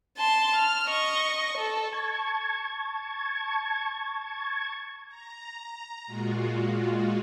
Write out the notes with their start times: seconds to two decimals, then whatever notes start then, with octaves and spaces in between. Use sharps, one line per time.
0.18 A5 C6
0.56 F6
0.87 D#5 C#6
1.58 A4
1.92 A5 C#6 G#6
5.08 A#5
6.07 A#2 G#3 F4 F#4